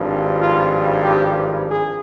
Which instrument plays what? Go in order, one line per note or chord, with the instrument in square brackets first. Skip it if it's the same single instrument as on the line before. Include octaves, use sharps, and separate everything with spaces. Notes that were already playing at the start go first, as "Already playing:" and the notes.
Already playing: [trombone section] G#1 G2 F3
F4
G4
G#4